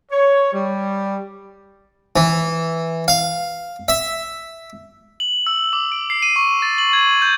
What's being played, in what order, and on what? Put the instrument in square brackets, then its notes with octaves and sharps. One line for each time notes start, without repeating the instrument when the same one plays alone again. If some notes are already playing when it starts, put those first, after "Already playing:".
[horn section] C#5
G3
[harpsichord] E3
F5
E5
[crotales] F#7
E6
D6
D7
C7
D#7
C#6
A6
F#7
G#6
G6